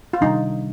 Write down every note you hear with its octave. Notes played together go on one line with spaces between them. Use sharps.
F4
C3 D#3 G3 D4 D#4